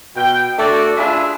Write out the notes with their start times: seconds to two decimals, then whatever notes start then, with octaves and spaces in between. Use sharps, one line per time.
0.15 B2 G5
0.57 A3 D4 F#4 A4 D5
0.97 D4 F4 G#4 B4 E5